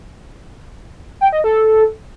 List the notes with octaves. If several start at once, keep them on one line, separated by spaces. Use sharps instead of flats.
G5
D#5
A4